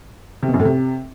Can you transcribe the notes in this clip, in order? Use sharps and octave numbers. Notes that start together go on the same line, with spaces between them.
C3
B2
F#2
A2
C3